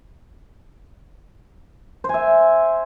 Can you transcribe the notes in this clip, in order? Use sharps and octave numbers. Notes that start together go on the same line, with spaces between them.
C5 E5 G#5